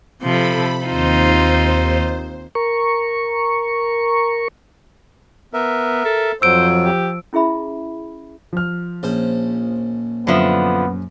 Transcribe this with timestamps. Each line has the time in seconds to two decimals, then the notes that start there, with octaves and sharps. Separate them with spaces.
0.22 C3 F3 A4 B5
0.85 D#2 C4 D#4 F4 C5
2.55 A#4 C#6
5.53 B3 A#4 E5
6.05 A4
6.42 F2 F3 F#3 C5 E6 D7
6.85 G4
7.33 C#4 E4 G#4 E5 B5
8.53 F3 F6
9.03 A#1 C#4 C5
10.27 F#2 D3 F3 B3 E5